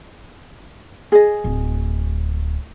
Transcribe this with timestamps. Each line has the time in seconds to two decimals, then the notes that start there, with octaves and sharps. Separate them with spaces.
1.12 G#4 D#5
1.44 D1